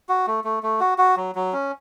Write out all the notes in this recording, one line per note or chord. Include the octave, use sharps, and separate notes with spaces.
F#4
A3
A3
A3
F#4
F#4
F#3
F#3
C#4